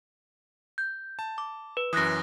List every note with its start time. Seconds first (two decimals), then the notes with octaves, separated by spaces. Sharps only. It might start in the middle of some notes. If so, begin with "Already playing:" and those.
0.78 G6
1.19 A5
1.38 D6
1.77 B4
1.93 F#2 E3 D#6 F#6 A#6